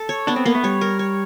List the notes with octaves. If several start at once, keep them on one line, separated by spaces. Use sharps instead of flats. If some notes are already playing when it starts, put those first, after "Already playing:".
Already playing: A4
C#5
B3 D4
C4
A#3 B3
A3
G3 C#5
A#4
C#5